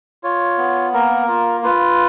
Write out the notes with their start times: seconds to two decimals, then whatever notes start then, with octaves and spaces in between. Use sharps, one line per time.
0.24 F4 C#5
0.58 B3
0.93 A#3 A#4
1.28 F4
1.63 F4 B4